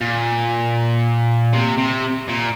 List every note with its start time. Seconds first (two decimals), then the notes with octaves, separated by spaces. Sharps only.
0.01 A#2
1.53 C3
1.78 C3
2.29 A#2